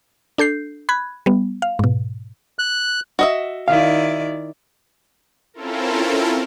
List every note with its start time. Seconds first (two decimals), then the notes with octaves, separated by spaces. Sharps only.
0.38 D4 A4 G6 C7
0.89 B5 F#6 G#6
1.26 G3 B3
1.62 F5
1.79 G#2 B2
2.59 F#6
3.19 F#4 D#5 E5
3.68 D#3 E4 D5 F5
5.54 C4 C#4 E4 F4 A4 A#4